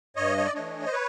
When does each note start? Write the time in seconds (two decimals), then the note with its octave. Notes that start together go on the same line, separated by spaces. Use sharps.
0.16 G2 C#5 D#5
0.38 C#5
0.45 D5
0.54 E3 A3 D4 C#5 D#5
0.86 C5
0.92 B4 C#5